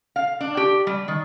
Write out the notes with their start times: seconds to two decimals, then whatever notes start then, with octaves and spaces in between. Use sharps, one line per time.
0.16 F5
0.41 D4
0.57 G4
0.87 G3
1.08 D#3